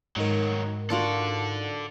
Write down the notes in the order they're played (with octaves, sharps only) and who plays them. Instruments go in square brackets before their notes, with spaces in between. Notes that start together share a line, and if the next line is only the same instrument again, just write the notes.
[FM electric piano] G#2 D#4 A#4 [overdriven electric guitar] D#3 F#3
[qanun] D4 F4 F#4 [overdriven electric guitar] A4 D5